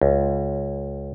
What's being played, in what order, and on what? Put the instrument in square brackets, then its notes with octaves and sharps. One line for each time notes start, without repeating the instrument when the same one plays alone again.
[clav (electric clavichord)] C#2